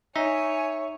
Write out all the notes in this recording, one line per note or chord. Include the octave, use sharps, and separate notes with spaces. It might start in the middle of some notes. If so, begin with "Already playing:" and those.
D#4 C#5 E5 G#5